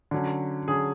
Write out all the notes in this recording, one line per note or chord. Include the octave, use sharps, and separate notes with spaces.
D3 F#3 C#4
D3 F#3 C#4 G#4